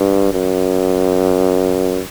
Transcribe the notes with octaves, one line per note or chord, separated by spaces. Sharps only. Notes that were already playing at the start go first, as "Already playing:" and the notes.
Already playing: G2
F#2